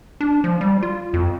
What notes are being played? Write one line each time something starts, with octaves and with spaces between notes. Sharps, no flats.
D4
F3
G3
F4
F2